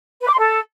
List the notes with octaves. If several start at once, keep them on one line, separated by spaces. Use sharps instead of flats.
B4
D6
C6
A4